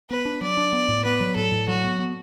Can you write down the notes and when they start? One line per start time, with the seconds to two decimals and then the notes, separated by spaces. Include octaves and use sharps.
0.10 B3 B4
0.25 D4
0.41 F#3 D5
0.57 D4
0.73 B3
0.89 A2
1.04 B3 B4
1.20 F#3
1.36 A2 A4
1.52 A2
1.68 F#3 F#4
1.84 B3
1.99 B3